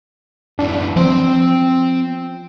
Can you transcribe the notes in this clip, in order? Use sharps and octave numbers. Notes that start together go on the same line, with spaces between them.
F#2 E3 D4
F3 C4 C6